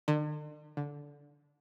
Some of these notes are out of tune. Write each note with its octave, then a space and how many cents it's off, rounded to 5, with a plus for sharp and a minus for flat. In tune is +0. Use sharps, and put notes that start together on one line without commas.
D3 +45
D3 -15